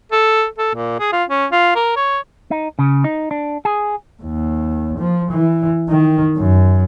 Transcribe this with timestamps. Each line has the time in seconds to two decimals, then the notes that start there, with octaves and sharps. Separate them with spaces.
0.12 A4
0.59 A4
0.75 A#2
0.99 G#4
1.13 F4
1.29 C#4
1.52 F4
1.75 A#4
1.96 C#5
2.51 D#4
2.79 C#3
3.04 D#4
3.31 D4
3.65 G#4
4.23 D#2
4.99 F3
5.31 E3
5.89 D#3
6.37 F#2